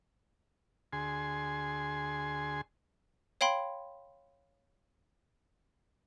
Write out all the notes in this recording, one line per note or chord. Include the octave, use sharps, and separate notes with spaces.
D2 G#4 G#5 C6
C#5 F5 G5 B5 C6